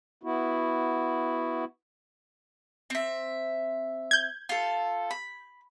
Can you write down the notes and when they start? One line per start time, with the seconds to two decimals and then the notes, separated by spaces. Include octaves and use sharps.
0.23 B3 E4 F#4
2.90 C4 E5
4.11 G6 G#6
4.49 F4 A4
5.11 B5